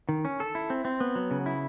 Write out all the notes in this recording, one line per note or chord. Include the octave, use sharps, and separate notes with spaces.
D#3
C#4
A4
E4
C4
C4
B3
F#3
C#3
E4